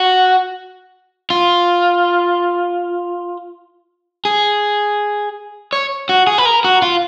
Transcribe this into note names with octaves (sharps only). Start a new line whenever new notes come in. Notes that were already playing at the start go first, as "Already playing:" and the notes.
Already playing: F#4
F4
G#4
C#5
F#4
G#4
B4
A#4
F#4
F4